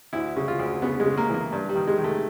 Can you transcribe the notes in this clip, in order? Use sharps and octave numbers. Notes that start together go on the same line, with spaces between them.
D2 E4
C#3
F4
D2
C#3 B3
G#3
C#3
A#3
E3 A#3
G2
G3
D#3
G#3
D#3
A3